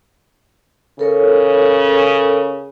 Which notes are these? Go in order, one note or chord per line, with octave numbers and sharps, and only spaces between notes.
C#3 A4 A#4 C#5